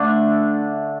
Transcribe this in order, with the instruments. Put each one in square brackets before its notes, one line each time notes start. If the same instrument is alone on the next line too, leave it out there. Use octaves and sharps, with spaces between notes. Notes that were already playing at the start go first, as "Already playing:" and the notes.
Already playing: [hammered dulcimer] D3 A3 D4